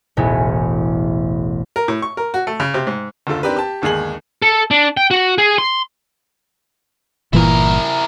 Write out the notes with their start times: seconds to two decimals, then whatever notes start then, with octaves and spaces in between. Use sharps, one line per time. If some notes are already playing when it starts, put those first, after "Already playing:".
0.17 E1 A1 B3 E4 G#4
1.76 A#4
1.88 A2
2.02 C#6
2.17 A#4
2.34 F#4
2.47 A3
2.60 C#3
2.74 C3
2.87 G#2
3.27 F#1 D2 F4 A4
3.43 D#3 C4 D4 G4 A#4 B4
3.56 G4 A5
3.82 G1 D#2 G#3 G#4 F#7
4.42 A4
4.71 D4
4.97 G5
5.11 F#4
5.38 G#4
5.58 C6
7.33 G1 A#2 E3 E4 A#4